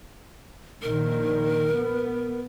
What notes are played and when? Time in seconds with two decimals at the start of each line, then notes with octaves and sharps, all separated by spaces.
0.82 A#1 A#2 D#3 A#4
1.73 B3